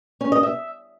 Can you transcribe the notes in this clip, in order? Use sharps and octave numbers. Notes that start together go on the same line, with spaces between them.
C#4
D#5
E5